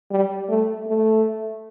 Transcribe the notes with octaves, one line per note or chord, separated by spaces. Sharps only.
G3
A3
A3